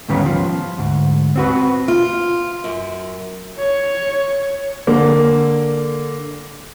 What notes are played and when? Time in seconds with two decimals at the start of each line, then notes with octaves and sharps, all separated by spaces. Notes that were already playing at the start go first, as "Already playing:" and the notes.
0.09 D2 G#2 D#3 G3 B3 C#4
0.26 F3
0.78 D2 G#2
1.36 C4 F#4 B4
1.88 F4
2.64 F#2
3.58 C#5
4.87 D3 A#3